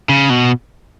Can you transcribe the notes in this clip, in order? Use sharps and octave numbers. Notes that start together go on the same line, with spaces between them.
C#3
B2